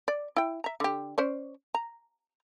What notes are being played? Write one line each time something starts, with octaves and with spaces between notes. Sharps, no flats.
D5
E4 G5
E5 A#5
D3 G4
C#4 C5 D5
A#5